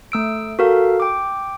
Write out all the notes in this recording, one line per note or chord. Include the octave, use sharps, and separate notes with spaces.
A3 E6 D7
F#4 A4 A#4 F5
G5 D6